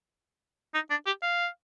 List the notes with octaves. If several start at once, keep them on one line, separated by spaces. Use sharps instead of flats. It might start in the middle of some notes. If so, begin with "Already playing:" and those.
D#4
D4
G4
F5